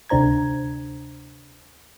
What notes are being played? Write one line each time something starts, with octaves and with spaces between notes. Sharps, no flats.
D2 C3 D4 C5 A#5 G#6